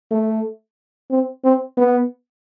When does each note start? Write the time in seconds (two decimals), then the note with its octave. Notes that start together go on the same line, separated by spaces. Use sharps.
0.11 A3
1.11 C4
1.44 C4
1.77 B3